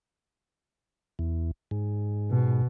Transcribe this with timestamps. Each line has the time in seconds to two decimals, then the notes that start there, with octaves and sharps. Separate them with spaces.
1.19 E2
1.71 G#2
2.30 B2